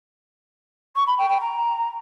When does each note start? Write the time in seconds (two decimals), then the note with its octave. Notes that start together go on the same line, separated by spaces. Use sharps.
0.95 C#6
1.07 B5
1.18 G5
1.29 G5
1.40 A#5